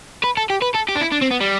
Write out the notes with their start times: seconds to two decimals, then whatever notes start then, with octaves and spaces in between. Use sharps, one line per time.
0.23 B4
0.37 A4
0.50 G4
0.62 B4
0.75 A4
0.89 G4
0.96 D4
1.01 E4
1.12 D4
1.21 C4
1.31 B3
1.40 G3